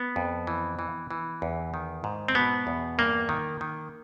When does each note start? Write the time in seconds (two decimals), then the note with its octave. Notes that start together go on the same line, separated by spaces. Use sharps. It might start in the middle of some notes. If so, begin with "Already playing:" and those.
Already playing: B3
0.16 F2
0.47 E3
0.79 E3
1.11 E3
1.42 E2
1.74 D#3
2.04 G#2
2.28 C4
2.35 B2 B3
2.67 E2
2.98 G2 A#3
3.29 D#3
3.61 D#3